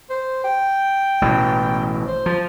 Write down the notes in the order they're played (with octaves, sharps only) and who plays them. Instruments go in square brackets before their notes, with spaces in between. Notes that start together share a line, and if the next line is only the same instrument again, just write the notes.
[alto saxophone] C5
G5
[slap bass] A1 B2 E3
[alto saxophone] C5
[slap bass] F3